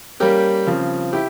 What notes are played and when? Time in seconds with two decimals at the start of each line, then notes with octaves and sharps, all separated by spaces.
0.20 G3 A#3 C#4 G4 A#4
0.67 C#3 F3 C4
1.13 E4 G4